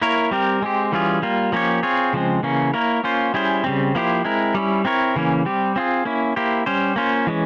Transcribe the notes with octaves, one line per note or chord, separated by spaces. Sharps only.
A#3 E4 A#4 C#5
G3 C4 G4 A#4
G#3 C4 G4
E3 G3 C#4 F4 G#4
G3 A#3 F4
F3 A#3 C#4 G4 C#5
C4 F4 G#4 C#5
C#3 F3 G#3 C4
C#3 E3 A#3 C#4
A#3 E4 A#4 C#5
A#3 C#4 F4 C5
G3 C#4 E4 G#4 C5
C#3 G3 C4
F3 A#3 E4 G4 C5
G#3 C4 E4 A#4
G3 C#4 E4
C4 E4 A#4 C#5
C#3 E3 A#3 C#4
G3 C4 G4
C4 F4 G#4
A#3 C#4 E4
A#3 E4 G4 C5
G3 C#4 G4 C5
A#3 C#4 F4 C5
E3 G#3 C#4